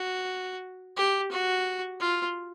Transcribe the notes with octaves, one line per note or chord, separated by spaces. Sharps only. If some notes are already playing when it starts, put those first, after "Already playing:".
Already playing: F#4
G4
F#4
F4